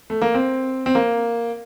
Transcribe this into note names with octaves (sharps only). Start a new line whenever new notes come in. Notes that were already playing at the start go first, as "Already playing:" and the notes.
A3
A#3
C4
C4
A#3